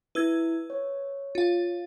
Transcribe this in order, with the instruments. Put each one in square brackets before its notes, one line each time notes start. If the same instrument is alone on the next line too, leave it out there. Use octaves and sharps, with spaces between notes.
[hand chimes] E4 [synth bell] B4 E6 G#6
[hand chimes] C#5
[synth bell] F4 F5